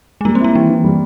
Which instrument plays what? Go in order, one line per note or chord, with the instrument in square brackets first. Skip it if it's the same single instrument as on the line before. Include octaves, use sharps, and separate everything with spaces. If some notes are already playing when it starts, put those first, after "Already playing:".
[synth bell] G#3
[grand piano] G3 [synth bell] A#3
[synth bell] C4
[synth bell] A#3 [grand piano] E4
[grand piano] E3 [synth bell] G3
[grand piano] E3
G3